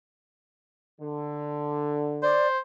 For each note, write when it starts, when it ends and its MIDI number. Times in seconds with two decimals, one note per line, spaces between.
1.00 2.37 50
2.22 2.59 72
2.22 2.47 74